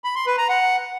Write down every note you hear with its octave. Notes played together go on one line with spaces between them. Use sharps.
B5
C6
B4
A#5
F#5